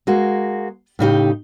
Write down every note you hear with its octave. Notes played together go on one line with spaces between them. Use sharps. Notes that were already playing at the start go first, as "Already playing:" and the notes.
G#3 A#3 F#4
A2 C#3 D#4 G4